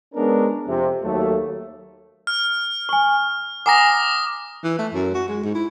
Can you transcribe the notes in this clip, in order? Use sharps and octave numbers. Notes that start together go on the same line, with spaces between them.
G#3 B3 C#4 D4 A#4
F2 C3
D#2 F#3 A3
F6
G#5 C#6
F#5 G#5 A#5 D6 D#6 A#6
E3
A3
F#2
F#4
G#3
G#2
E4